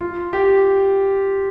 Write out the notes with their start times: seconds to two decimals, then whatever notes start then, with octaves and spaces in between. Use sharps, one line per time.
0.01 F4
0.33 G4